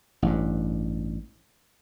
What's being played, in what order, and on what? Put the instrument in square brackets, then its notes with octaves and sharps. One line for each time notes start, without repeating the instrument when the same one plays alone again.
[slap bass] A1 G2